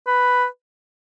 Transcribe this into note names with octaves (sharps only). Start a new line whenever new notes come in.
B4